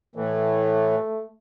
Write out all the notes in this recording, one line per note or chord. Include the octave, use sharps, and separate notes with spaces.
A2 E3 A3